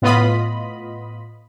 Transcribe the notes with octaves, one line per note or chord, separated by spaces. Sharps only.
A2 B3 F4 D#5 B5